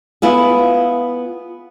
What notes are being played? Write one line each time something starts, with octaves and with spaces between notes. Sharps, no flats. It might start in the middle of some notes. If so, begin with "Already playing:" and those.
B3 E4 F4 G#4